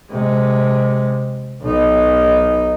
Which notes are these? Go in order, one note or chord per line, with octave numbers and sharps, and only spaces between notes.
C3 G#3
B1 D#4